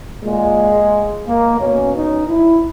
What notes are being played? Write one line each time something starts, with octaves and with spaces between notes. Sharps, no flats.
A#2 G#3
A#3
B2 C#4
D#4
E4